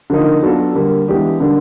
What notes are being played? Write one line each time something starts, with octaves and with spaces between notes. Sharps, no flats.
D3 F3 A#3 D#4
F#3 B3 D4 F4 A4
D3 G3 A#3
E3 G#3 B3 D4 G4
D3 G3 A#3 D4